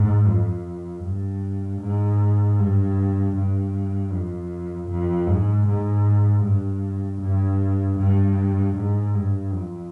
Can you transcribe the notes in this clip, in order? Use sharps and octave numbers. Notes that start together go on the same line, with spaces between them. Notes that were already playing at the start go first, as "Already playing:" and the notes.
Already playing: G#2
F2
G2
G#2
G2
G2
F2
F2
G#2
G#2
G2
G2
G2
G#2
G2
F2